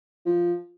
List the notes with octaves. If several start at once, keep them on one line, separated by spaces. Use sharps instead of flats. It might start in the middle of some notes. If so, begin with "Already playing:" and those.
F3